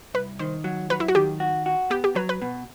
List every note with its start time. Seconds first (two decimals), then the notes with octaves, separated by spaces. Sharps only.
0.14 C2 B4
0.39 D#3 C5
0.64 F#3
0.90 F#3 B4
1.00 E4
1.08 F#4
1.15 D#3 G4
1.40 F#4
1.66 F#4
1.90 B3 G4
2.04 G4
2.15 F#3 B4
2.29 B4
2.42 B2